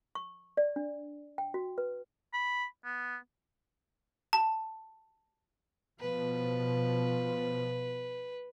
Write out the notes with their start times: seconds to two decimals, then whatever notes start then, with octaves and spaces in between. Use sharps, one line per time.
0.15 C#6
0.57 D5
0.76 D4
1.38 G5
1.54 F#4
1.78 B4
2.34 B5
2.85 B3
4.33 A5
6.00 B2 F3 B4